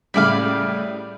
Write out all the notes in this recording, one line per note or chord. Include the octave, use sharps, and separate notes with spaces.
A2 C#3 G3 E4 D5 F5